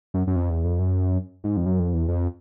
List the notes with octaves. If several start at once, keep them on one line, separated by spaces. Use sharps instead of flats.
F#2
F#2
F2
E2
F2
F#2
G#2
F2
F#2
F2
E2
F2